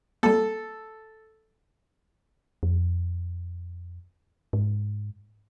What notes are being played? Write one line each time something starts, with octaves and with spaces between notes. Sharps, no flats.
G3 A#3 A4
F2
G#2